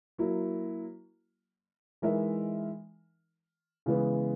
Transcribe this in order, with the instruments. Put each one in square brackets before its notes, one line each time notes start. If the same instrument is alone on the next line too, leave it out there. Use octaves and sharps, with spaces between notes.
[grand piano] F#3 A#3 E4
E3 G#3 D#4 A#4 E5
C#3 E3 G#3 B3